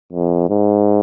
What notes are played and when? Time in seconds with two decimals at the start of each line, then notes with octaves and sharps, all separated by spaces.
0.13 F2
0.49 G#2